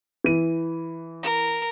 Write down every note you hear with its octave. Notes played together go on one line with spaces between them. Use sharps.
E3 D#7
A#4